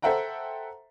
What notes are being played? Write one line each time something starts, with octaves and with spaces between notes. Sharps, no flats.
A4 C5 E5 F#5 G5 A#5